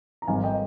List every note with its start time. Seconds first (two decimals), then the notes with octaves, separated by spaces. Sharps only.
0.22 A#5
0.27 G#1 G#2 G3 F5 G#5
0.44 D#5 G5